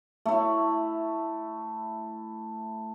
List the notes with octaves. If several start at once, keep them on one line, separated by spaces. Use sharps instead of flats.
A3 E4